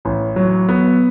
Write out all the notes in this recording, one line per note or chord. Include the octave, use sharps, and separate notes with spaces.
A1
F#3
B3